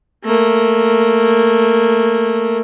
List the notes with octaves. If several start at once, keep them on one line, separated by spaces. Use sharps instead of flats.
A3 A#3